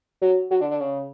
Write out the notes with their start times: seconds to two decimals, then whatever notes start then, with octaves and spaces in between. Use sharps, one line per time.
0.22 F#3
0.51 F#3
0.61 D3
0.71 D3
0.80 C#3